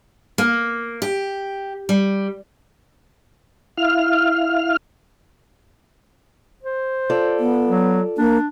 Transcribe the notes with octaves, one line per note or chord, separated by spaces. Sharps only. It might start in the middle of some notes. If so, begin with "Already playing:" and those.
A#3
G4
G3
E4 F5 F6
C5
F4 A4 D5
B3
F#3
A#3 D4